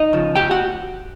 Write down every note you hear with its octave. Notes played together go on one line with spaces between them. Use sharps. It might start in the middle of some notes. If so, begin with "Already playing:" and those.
Already playing: D#4 D#5
C#3 F3
D2 G4 G5
F#4 F#5